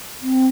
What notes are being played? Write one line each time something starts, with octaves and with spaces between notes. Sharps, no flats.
C4